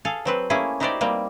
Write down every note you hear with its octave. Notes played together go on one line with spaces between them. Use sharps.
G#4 A4 F5
F#3 C4 B4
A3 A#3 C#4 E4 G#4
D#4 E4 F#4 G4 C5 D5
G3 A#3 C4